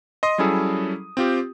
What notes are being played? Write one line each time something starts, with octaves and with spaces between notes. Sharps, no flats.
D#5 C6 D#6
F#3 G3 C#4 E4 G#4 A4
C4 F4 G4